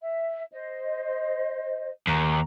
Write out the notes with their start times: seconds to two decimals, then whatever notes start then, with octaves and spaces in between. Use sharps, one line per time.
0.02 E5
0.52 C5 D#5
2.07 D#2 A#5